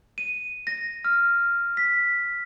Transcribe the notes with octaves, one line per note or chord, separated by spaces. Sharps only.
D#7
A#6
F6
B6